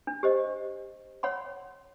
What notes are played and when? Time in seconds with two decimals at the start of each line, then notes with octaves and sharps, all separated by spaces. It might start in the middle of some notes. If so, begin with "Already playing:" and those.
0.07 D4
0.23 G4 C5 D#5
1.23 C#5 F#5 B5 C6